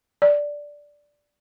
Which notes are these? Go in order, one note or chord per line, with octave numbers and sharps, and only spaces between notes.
D5